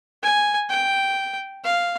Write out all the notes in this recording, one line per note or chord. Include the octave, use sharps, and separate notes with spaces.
G#5
G5
F5